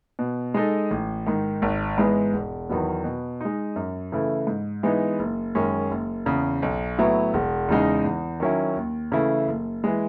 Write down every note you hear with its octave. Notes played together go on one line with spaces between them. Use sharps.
B2
G#3 D#4 A4
A1
G#2 D#3
G#1
G#2 E3 G#3 B3
E1
E2 D#3 F#3 B3
B2
G#3 D#4
F#2
C#3 E3 A3 E4
G#2
E3 G#3 B3 D#4
F#1
F#2 D#3 G#3 C#4
F#1
E2 C#3
B1
A2 F#3 B3 E4
E1
E2 C#3 G#3 D#4
E2
D#3 F#3 C#4 E4
D#2
C#3 E3 A3 E4
F#1
E3 G#3